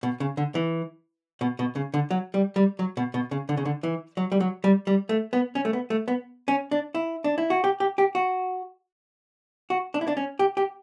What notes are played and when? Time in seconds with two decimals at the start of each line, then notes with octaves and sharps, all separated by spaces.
0.03 B2
0.20 C#3
0.37 D3
0.55 E3
1.41 B2
1.59 B2
1.76 C#3
1.94 D3
2.11 F#3
2.34 G3
2.56 G3
2.79 F#3
2.97 B2
3.14 B2
3.31 C#3
3.49 D3
3.57 C#3
3.65 D3
3.83 E3
4.17 F#3
4.32 G3
4.40 F#3
4.64 G3
4.87 G3
5.09 A3
5.33 B3
5.55 C#4
5.65 A3
5.73 B3
5.90 A3
6.08 B3
6.48 C#4
6.71 D4
6.95 E4
7.24 D4
7.38 E4
7.50 F#4
7.64 G4
7.80 G4
7.98 G4
8.15 F#4
9.70 F#4
9.94 D4
10.01 E4
10.08 D4
10.17 C#4
10.39 G4
10.57 G4